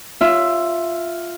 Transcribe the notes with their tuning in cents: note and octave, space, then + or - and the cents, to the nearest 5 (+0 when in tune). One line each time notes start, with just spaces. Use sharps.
F4 +0 E5 +10